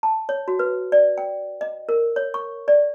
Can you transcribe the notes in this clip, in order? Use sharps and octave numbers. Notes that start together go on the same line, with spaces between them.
A5
C#5
F#4
B4
D5
G5
D#5
A#4
C#5
C#6
D5